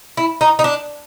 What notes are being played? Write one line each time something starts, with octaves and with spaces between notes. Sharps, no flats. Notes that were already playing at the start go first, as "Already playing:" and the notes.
E4
D#4
D#4
D4